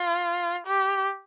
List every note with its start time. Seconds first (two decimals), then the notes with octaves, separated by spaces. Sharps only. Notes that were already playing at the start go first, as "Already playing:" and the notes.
Already playing: F4
0.67 G4